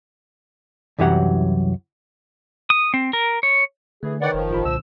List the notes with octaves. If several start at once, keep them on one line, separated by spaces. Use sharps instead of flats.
C2 F#2 E3 F#3 G4 F#5
D#6
C4
A#4
C#5
D3 E3 A3 G#4
D#3 B4 C#5 D5 F#5 G5
F#1 F3
A1 F4 B5
C2 A#2 D3 E6